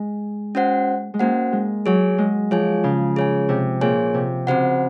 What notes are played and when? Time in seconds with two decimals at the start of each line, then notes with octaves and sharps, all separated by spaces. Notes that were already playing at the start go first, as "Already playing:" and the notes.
Already playing: G#3
0.55 C#4 F#4 C5 F#5
1.14 G#3
1.19 A#3 C#4 F#4 C5 F#5
1.52 G#3
1.86 F#3 G#4 C#5 G#5
2.18 G#3
2.51 F3 G#4 C#5 G#5
2.84 C#3
3.16 G#4 C#5 G#5
3.49 C3
3.81 A#2 G#4 C#5 G#5
4.14 C3
4.47 C#3 C4 F#4 C5 F#5